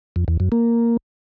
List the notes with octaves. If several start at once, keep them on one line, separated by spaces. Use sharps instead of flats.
F2
E2
F#2
A#3